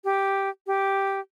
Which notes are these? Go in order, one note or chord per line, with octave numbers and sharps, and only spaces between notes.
G4
G4